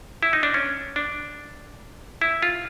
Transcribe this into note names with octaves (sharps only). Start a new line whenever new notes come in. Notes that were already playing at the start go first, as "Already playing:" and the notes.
E4
D#4
D4
C#4
D4
E4
F4